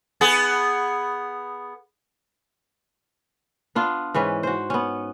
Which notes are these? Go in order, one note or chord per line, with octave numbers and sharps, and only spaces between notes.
B3 G#4
B3 D4 F4
G#2 E3 C#4 B4
F#4 C5
B3 C#4